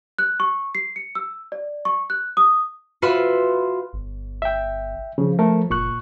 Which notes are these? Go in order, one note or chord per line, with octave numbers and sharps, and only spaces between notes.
F#6
C#6
C7
C#7
E6
D5
C#6
F#6
D#6
F4 F#4 B4 E5 B5 C6
G1
E5 G5
C#3 F3
A3 A4 A#4
F#1 A#2 C#6 F#6